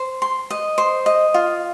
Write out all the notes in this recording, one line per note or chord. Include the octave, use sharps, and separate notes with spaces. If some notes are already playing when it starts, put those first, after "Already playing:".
Already playing: C5
C6
D#5
C5
D#5
F4